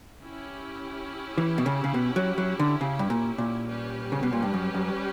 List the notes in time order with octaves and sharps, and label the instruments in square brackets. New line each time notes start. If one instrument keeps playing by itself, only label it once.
[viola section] C#4 E4 G4
[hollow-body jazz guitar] E3
B2
C#3
C#3
B2
F#3
F#3
D3
C#3
G2
A#2
A#2
[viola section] G3 C#4 G4 B4
[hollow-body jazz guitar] C#3
B2
A#2
G2
F#2
F#2